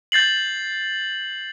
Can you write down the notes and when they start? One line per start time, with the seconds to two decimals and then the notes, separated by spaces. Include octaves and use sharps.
0.12 G6 A6 C7 F#7